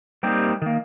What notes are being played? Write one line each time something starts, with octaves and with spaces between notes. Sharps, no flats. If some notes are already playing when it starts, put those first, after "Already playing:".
G3 A#3 C4 D#4 G4
D#3 A#3